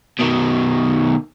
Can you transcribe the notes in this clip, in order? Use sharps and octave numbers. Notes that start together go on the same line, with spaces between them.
B2 D#3